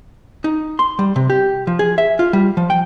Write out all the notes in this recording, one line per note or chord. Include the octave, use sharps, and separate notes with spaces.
D#4
C6
G3
C3
G4
F3
G#4
E5
F4
G3
F3
G5